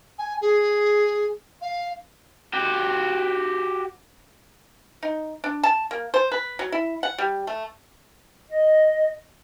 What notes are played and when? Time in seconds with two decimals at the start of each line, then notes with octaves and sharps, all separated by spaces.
0.18 G#5
0.41 G#4
1.61 F5
2.53 F#4 G4
5.03 D#4
5.44 D4
5.63 A5
5.91 A#3
6.14 C5
6.32 B4
6.59 F#3
6.72 E4
7.03 F#5
7.18 G3
7.47 A3
8.48 D#5